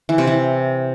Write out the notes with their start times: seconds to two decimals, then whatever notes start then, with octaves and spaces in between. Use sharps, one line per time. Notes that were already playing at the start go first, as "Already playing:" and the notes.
0.09 E3
0.18 C3
0.27 E3